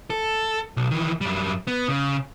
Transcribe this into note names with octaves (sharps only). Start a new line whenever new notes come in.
A4
B1
D#3 E3
F#2 G3
B3
C#3